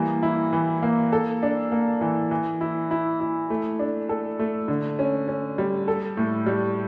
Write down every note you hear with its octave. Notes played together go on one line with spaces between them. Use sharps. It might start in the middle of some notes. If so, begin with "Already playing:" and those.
Already playing: E3 G3 A#3
E4
E3
A#3
A4
D4
A#3
E3
E3
E4
E4
E4
A3
D4
A4
A3
D3
C#4
C#4
G3
A4
A2
G3